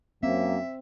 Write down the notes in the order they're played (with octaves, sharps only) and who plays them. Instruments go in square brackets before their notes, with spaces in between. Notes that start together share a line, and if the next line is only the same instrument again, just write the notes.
[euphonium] F#2 [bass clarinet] A#3 [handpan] C4 [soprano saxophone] E5